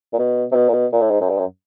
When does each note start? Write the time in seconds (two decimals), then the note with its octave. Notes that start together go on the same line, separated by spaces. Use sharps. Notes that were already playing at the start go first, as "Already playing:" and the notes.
0.13 A#2
0.19 B2
0.52 C3
0.55 B2
0.69 A#2
0.74 B2
0.92 A#2
1.01 A2
1.10 G#2
1.21 F#2
1.30 G2
1.38 F#2